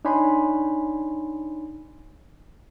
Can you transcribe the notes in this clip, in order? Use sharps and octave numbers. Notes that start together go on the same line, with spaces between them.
D4 D#4 C#5 G#5 B5 C6